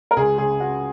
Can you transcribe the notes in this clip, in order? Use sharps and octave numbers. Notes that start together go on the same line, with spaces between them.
A#4
C#2 G#4
C#3 G#4
C#3 F#4